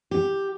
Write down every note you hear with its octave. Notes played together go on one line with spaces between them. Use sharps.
G4